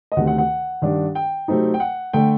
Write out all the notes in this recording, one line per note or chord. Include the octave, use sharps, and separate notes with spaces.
D#5
D2 C3 D#3 A3 F#5
F#5
F#5
G2 D#3 G3 D4
G5
C3 F#3 A3 C4 D#4
G5
F#5
D3 A3 G5